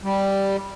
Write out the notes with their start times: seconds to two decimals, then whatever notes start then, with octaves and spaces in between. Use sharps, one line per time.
0.04 G3